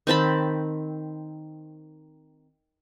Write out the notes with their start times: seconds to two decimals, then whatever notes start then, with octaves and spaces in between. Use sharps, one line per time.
0.07 D#3 C4 A5 B5